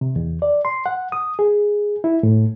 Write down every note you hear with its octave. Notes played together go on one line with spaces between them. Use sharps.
C3
E2
D5
C6
F#5
D#6
G#4
E4
A2